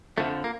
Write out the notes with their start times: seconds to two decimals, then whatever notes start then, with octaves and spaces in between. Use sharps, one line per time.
0.18 F2 D3 F3 A3
0.44 A#3